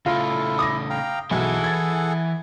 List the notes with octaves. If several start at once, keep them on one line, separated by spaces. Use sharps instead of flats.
C#3 A3 E4 F4 A4 A#6
D6 D#6 A#6
F5 G5 A#5
B1 E3 E4 G#4 A4 F#5
G#6 A6